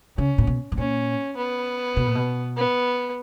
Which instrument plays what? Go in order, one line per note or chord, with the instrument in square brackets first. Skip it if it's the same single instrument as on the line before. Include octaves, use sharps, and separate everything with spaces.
[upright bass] C#3 [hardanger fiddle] C#4
[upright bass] A#2
B2
G#2
[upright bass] A#2 [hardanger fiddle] C#4
[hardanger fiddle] B3
[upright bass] B2
A#2
B2
[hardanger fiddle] B3